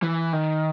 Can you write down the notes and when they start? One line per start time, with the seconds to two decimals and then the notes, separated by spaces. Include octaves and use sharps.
0.03 E3
0.33 D#3